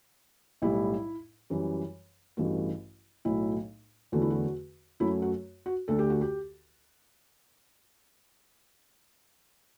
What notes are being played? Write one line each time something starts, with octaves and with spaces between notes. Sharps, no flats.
B1 A2 G3 E4
F#2 E3 G3
A1 G2 E3 A3 F#4
B1 A2 F#3 A3 E4
E2 D3 F#3 A3 F#4
E4
F#4
F#2 F#3 A3 E4
F#4
F#4
D2 D3 A3 A4
G4
F#4
G4